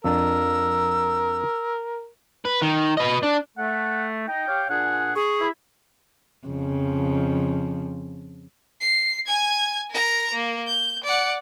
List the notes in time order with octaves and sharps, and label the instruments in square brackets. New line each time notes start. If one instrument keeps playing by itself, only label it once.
[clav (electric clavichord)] F2 D4 [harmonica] A#4 [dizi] E6
[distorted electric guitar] B4
D#3
B4 D#5
D4
[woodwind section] A3 [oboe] F#5
[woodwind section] D#4 [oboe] G5
[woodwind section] G4 C#5 F5
[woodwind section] A#2 D4 G#4 [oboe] F#5
[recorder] G#4 [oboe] C#6
[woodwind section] E4
[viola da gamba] F2 C#3 F3
[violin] C7
G#5 G#6
A#4 A#5
A#3
G6
D5 F#5